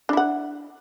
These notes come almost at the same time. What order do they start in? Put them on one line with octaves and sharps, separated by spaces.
D4 E4 F#5